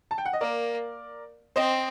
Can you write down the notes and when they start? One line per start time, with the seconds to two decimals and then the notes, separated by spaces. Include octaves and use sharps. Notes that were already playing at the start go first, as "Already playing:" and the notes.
0.11 A5
0.18 G5
0.25 F#5
0.33 D#5
0.41 A#3 A#4 D5
1.56 C4 C5 D#5